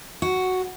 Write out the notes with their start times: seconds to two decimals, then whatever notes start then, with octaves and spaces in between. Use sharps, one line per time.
0.22 F#4